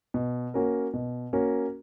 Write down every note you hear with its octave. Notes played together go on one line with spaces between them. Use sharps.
B2
A#3 C#4 F#4 A#4
B2
A#3 C#4 F#4 A#4